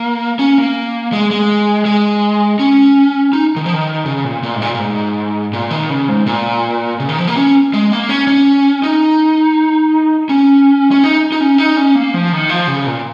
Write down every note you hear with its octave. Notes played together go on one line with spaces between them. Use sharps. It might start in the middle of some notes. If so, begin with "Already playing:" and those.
Already playing: A#3
C#4
A#3
G#3
G#3
G#3
C#4
D#4
D#3
F3
D#3
C#3
A#2
A#2
G#2
A#2
A#2
G#2
A#2
D#3
C#3
G#2
A#2
C#3
D#3
F3
A#3
C#4
G#3
A#3
C#4
C#4
D#4
C#4
C#4
D#4
D#4
C#4
D#4
C#4
A#3
F3
D#3
F3
C#3
A#2